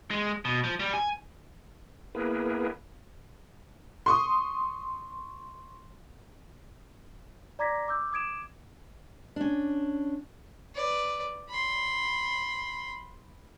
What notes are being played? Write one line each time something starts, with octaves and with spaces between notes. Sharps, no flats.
G#3
B2
F3
G3
G#5
A#3 B3 E4 G#4 A#4 B4
C6 C#6 D#6
D5 A#5 D6 G#6 A#6 B6
D6 E6 G6
D6 D#6 G#6 D7 E7
C#4 D4
B4 D5
B5 C6